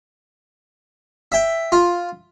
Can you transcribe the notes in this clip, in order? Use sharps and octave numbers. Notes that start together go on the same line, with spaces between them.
E5 G5
F4